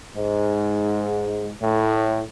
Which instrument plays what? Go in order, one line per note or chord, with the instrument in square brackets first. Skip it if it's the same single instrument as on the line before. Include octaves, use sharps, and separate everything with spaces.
[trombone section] G#2
A2